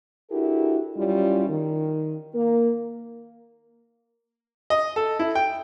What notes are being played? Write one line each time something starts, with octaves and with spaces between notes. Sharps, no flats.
D4 E4 F#4 G4 A4 A#4
F#2 G3 C#4 E4 F4
D#3
A#3 A#4
D#5
A4
E4
G5